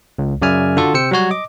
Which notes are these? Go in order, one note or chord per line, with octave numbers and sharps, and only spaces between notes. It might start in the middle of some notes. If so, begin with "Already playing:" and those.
C#2
F#2 C#3 D5 E5 G#5 F6
D3 F4 F#4 A4
C3 C5 G5 E6 C#7
F#3 G3 F#4 C#5
D#5 D6